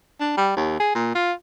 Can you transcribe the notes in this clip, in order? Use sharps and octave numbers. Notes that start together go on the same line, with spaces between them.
D4
G3
D#2
G#4
A#2
F4